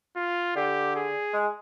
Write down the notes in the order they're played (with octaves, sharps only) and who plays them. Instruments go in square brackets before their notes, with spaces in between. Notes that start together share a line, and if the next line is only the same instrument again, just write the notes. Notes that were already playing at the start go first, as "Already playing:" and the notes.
[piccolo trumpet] F4
[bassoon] D3 [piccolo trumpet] G4
[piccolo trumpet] G#4
[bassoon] G#3